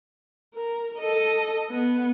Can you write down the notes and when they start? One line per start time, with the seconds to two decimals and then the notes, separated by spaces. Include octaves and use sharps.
0.55 A#4
0.99 A4 D#5
1.70 B3